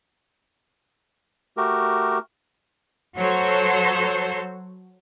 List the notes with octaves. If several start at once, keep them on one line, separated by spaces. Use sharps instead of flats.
A3 F#4 G4 A#4
F#3 F#4 A4 C5 C#5